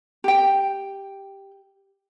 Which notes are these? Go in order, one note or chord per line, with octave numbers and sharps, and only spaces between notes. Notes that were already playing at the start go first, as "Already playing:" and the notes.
G4 G5